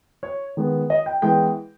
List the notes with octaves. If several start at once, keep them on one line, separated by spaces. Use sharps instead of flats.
C#5
D#3 G#3 B3
D#5
G5
E3 G#3 B3 G5